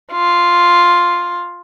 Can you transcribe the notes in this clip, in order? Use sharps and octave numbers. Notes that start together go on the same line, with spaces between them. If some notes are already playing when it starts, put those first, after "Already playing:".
F4